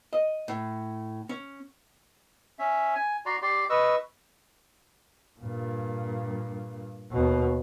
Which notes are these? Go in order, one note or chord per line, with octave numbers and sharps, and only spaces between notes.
D#5
A2
C#4
C#4 E5
G#5
F#4 D5 A#5 C6
G4 D5 C6
B4 D#5 C#6 E6
G2 A#2
D#2 B2